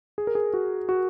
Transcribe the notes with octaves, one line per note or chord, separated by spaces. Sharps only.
G#4
A#4
G#4
F#4
F#4